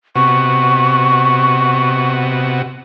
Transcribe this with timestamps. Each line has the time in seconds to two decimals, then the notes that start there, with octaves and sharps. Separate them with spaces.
0.15 C3 B3 F#4 C#6